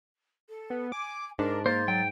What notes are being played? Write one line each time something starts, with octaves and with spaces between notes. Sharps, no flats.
A4
B3
G#5 D6
G#2 D4 A#4
A#3 C5 A6
F#3 G5